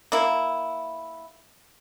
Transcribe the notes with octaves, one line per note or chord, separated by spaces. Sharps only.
A#3 E4